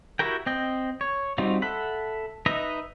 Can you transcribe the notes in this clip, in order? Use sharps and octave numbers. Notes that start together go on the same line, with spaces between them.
E4 F#4 G4 A#4 G5
C4 D#5 G5
C#5
G3 C4 D#4 F4 F#4
A4 E5 F#5 B5
D#4 B4 D#5 E5 A#5